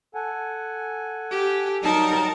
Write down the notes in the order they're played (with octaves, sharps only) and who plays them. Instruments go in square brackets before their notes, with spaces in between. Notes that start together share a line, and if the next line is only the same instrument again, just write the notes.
[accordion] A4 F#5 G#5
[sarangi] G4
[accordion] F#3 G3 [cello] D#4 A#4 [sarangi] A5